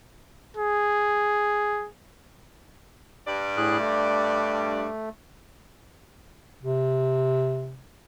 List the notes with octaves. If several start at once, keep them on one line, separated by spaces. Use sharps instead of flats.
G#4
G2 D5
A2 G#4 F#6
A3
C3